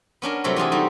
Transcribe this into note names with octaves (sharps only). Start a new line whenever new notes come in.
B3 C#4 D4 A#4
C3 F#3 G3 A3 F#4 A4
E3 F4 G#4 A4
G3 D#4 F#4